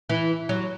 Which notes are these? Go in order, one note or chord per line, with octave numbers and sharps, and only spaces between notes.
E3
F#3